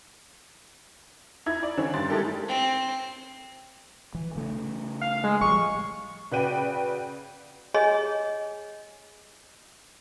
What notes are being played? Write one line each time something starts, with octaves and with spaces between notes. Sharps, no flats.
D#4 E4 G#6
D5
D3 D#3 C4 C#4
G2 C6 A6
G#3 D#4 E4 G4 A4 A#4
C4
E3
C#3 A3
F5
G#3
A1 F3 G3 C#6
C#3 F#4 B4 D5 G5 D#7
G#4 C#5 D#5 G#5